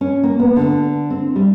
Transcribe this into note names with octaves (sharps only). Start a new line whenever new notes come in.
C#4
A#3
B3
D3
C4
G3